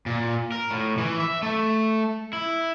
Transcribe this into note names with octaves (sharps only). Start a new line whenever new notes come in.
A#2
A#4
A2
E3
E5
A3
E4